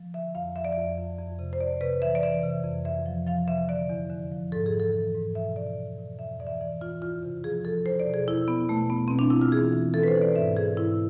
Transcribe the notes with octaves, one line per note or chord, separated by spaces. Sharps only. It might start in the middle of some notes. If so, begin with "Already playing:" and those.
Already playing: F3
D3 E5
F2 F5
F3 E5
D5
F2 E5
F2
F2
C3
C5
F2 D5
C3 B4
E3 E5
D5
E3 E5
C3
F2
F2 E5
F3
F3 F5
C3 E5
D3 D5
E2
D3
F3
G#2 A4
G#4
E3
A4
E3
G#2
B2 E5
E2 D5
E2
B2
F2 E5
E3 D5
E5
E3 D5
E3 F4
E2 F4
C3
F3 G#4
F3 A4
E2 C5
D5
B2
G#4
E2 E4
E2 B3
B2 A3
B2 B3
B2 C4
D4
B2 E4
F4
E3 G#4
E3
E3 A4
B4
C5
E3
D5
G#2 E5
E3 G#4
G#2 E4